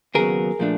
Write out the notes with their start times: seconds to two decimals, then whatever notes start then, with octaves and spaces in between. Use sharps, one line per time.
0.15 D#2 C#3 F#3 B3 G#4 A#4
0.59 A#2 F3 A3 D4